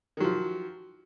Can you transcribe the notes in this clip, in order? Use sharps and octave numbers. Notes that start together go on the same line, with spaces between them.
D#3 F3 F#3